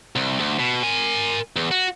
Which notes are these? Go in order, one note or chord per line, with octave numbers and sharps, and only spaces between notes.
C2
D2
B2
A#4 G#5
E2
F#4